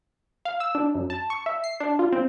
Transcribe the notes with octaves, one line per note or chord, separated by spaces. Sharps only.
F5
E6
D4
F#2
A5
C#6
E5
C7
D4
F4
C4